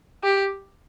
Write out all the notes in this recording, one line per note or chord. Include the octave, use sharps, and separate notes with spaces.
G4